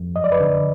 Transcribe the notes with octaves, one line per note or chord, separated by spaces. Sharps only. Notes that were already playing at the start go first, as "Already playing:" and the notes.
Already playing: F2
F#2 D#5
D5
B4
D3